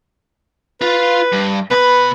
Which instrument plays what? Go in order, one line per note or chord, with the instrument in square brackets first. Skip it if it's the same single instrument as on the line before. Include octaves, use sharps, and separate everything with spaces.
[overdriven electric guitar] F4 F5 [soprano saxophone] B4
[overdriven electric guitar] G2
[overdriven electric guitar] B2 B5 [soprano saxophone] B4